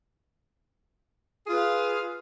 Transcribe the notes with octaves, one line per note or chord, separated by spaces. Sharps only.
F4 G#4 B4 F5